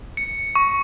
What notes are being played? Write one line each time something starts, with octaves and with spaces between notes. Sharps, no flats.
C#7
C#6